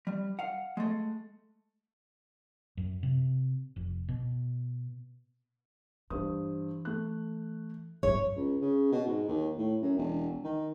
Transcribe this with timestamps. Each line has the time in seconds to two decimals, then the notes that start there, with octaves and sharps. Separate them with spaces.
0.07 G3
0.39 F5 F#5
0.77 G#3 A3
2.77 F#2
3.03 C3
3.76 F1
4.08 B2
6.10 G2 E3 C5 D#6
6.85 A3 F#6
8.03 G2 F#3 C#5
8.36 C#2
8.62 C#3
8.92 B2
9.07 G#2
9.28 D#2
9.58 A2
9.82 F#2
9.97 E1
10.44 D#3